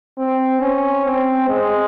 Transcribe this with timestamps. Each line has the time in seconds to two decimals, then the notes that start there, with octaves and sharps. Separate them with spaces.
0.19 C4
0.61 C#4
1.05 C4
1.49 G#3